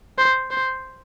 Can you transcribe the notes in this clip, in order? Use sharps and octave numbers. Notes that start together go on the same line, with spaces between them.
C5
C5